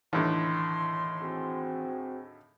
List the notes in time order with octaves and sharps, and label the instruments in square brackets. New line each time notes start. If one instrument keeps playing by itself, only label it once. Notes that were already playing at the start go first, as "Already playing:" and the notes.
[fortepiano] D#2 A2 D3 [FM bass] E3 [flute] C6
[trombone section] C4 F#4 G#4